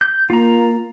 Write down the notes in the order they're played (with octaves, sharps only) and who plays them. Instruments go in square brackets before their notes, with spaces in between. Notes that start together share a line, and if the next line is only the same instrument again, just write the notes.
[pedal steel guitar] G6
[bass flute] A#3 [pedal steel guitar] F4 A#5